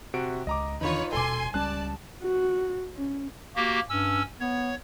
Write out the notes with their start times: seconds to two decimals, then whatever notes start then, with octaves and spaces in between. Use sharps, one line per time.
0.14 C3 F#4 D7
0.47 C#2 D#5 A#5 D6
0.81 E2 D3 D#3 D#4 F4 B4 C#5
1.13 D#1 B2 A4 G#5 C6 D6
1.54 C#2 G3 C#4 D5 A5 F#6
2.23 F#4
2.96 C#4
3.56 A#3 F#4 G4
3.89 G2 C#4 E6
4.40 B3 C#5